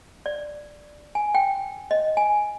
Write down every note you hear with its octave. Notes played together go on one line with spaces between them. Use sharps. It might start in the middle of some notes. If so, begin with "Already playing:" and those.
D5
G#5
G5
D#5
G#5